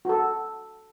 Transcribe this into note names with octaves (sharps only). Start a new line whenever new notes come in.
F#4 A4